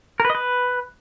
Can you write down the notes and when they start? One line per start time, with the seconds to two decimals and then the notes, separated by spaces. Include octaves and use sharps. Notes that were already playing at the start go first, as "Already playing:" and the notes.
0.20 A#4
0.25 B4
0.30 D#5
0.35 B4